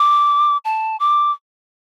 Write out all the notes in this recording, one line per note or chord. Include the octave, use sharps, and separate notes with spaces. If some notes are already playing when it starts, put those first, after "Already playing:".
Already playing: D6
A5
D6